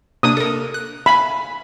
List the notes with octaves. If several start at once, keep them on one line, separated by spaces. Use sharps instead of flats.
C3 A#3 D4 D#6
A4 A#4
F#6
E5 F5 G#5 B5